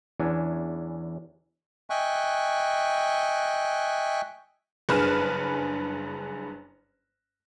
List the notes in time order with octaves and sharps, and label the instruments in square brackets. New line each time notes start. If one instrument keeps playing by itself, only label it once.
[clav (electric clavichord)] E2 E3 C#4 D4 G#5
[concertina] D#5 E5 G5 G#5 C#6 F#6
[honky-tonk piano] F#1 G2 G#4 B4 F6 E7